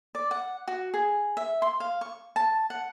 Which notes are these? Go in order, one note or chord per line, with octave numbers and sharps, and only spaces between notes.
D5
F#5
F#4
G#4
E5
C6
F5
C#6
A5
F#5